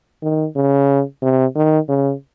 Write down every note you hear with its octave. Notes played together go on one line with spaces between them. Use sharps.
D#3
C#3
C3
D#3
C#3